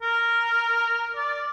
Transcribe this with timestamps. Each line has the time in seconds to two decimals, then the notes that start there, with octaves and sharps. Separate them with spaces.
0.02 A#4
1.16 D5